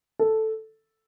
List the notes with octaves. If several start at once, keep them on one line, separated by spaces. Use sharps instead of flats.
A4